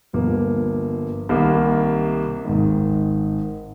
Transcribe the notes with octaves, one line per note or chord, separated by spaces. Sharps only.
G1 G2 F3 A#3
C2 C3 D#3 A#3
G#1 G#2 D#3